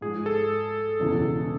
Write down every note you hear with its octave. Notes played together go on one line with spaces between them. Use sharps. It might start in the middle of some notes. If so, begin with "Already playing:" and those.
G#2 F3 G#3 G#4
A4
E1 E2 C#3 E3